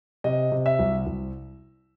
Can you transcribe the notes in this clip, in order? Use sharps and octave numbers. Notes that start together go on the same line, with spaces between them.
C3 D#5
C3
E5
C2
C2